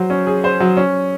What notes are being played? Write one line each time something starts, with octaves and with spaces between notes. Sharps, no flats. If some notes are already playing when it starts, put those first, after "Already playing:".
Already playing: F#3 C5
C#4
G#4
C5
F#3
C#4